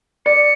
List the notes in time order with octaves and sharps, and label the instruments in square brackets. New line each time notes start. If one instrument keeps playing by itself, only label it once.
[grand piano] D5 [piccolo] C#7